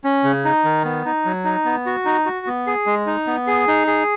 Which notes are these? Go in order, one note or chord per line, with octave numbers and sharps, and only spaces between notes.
C#4
C#3
D#4
D#3
B3
D#4
F#3
D#4
B3
F#4
D#4
F#4
B3
G#4
G#3
D#4
B3
G#4
D#4
G#4